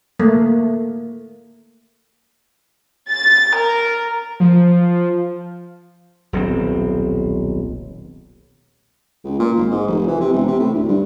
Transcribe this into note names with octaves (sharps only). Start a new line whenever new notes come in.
A3 A#3
A6
A#4
F3
D#1 B1 C4
C#2
A#2
G#1
G#2
F1
E3
C3
E1
C3
A2
D2
G2